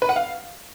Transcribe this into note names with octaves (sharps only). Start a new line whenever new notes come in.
B4
F#5
F5